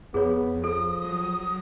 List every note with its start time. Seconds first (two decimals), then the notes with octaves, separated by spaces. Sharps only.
0.14 F2 B3 G#4 C#5
0.64 F3 A4 D#6
1.04 F#3